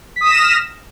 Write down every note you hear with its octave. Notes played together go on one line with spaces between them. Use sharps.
D#6 F6 A#6 B6 E7